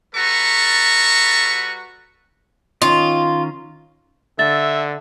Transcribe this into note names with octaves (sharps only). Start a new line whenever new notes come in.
G3 F#4 A4 B4 A#5 C#6
D#3 C#4 F4 D#5
D3 E5 A6